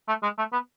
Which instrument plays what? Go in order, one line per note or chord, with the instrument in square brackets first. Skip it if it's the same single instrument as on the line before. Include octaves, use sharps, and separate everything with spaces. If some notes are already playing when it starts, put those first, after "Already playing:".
[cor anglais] A3
G#3
A3
B3